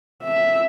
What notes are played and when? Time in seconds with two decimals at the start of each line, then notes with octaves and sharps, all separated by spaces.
0.23 E5